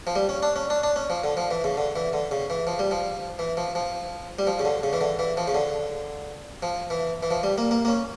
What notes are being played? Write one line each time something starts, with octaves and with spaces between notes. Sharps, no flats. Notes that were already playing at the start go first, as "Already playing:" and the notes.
F3
G3
C#4
D4
C#4
D4
D4
C#4
F3
D3
F3
E3
C#3
D3
E3
D3
C#3
E3
F3
G3
F3
E3
F3
F3
G3
F3
C#3
D3
C#3
E3
D3
E3
F3
C#3
D3
F3
E3
E3
F3
G3
A#3
A#3
A#3
C#4